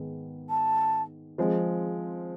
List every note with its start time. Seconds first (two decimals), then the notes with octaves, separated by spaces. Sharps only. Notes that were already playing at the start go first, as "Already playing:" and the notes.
Already playing: G#2 D#3 G#3 B3
0.49 A5
1.38 F3 G#3 C4